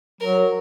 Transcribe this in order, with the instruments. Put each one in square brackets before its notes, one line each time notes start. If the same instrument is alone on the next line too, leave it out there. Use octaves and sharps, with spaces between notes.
[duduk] F#3 [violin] A#4